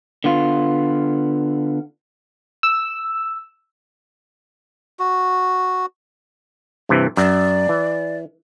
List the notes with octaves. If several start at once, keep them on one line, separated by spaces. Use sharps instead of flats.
D3 B3 F4
E6
F#4
G2 C3 E3
F#2 D5
E3